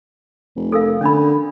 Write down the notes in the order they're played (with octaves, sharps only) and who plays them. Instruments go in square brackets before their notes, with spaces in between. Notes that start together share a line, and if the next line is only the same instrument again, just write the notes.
[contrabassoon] F1
[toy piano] A4 A#4 F5
[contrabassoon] D3 [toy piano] C#4 D4 B5